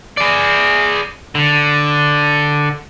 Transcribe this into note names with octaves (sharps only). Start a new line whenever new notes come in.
G#4 D5
D3